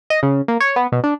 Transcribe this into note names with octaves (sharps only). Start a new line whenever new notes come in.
D#5
C#3
A#3
C#5
B3
B2
D4